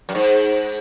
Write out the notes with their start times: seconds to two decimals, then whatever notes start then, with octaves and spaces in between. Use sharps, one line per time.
0.09 F#2
0.15 G#2